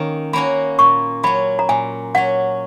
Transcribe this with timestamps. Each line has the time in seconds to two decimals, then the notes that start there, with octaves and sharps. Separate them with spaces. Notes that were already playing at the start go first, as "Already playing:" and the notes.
Already playing: D#3 A#3 C#4
0.33 A#3 C#4 F#4 B5
0.79 A#2 C#6
1.23 F#3 C#4 B5
1.59 A#5
1.69 A#2 G#5
2.15 F#3 C#4 F#5